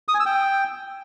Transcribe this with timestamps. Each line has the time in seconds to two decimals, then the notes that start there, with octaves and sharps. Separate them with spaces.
0.08 D#6
0.14 G#5
0.20 E6
0.26 G5